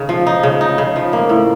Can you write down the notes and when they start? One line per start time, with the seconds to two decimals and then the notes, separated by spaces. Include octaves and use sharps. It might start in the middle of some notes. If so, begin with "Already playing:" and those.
Already playing: C#3 D#4
0.09 F3
0.27 D#4
0.43 C#3
0.61 D#4
0.78 C#3
0.96 F3
1.13 A#3
1.29 A2